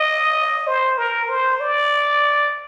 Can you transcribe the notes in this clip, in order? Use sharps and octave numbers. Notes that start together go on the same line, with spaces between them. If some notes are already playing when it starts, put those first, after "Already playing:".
Already playing: D#5
C5
A#4
C5
D5